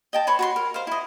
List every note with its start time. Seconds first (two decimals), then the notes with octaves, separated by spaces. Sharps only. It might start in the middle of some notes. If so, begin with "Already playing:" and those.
0.13 D#5 G5 A5
0.27 B4 C#5 B5 C6
0.39 F#4 A#5 C6
0.56 A#4
0.74 C5 F5
0.87 E4 D#5